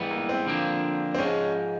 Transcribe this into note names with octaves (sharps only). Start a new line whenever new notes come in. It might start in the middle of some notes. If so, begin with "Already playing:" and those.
Already playing: G#2 E3 G3 B3
A#3
C4
D3 F3 A#3 D4
C4
G#2 F3 G#3 C#4